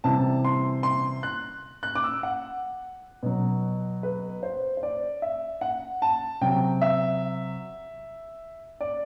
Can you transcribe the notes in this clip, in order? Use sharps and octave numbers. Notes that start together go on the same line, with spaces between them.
C3 E3 G3 A5
C6
C6
F#6
F#6
D6
E6
F#5
B2 F#3
B4
C5
C5
D5
E5
F#5
A5
C3 F#3 G5
E5
D5